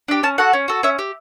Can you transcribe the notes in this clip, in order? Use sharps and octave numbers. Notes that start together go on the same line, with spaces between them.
D4 G4
C#4 A5
F#4 A4 F#5
C#4
F#4 A4
C#4 E5
G4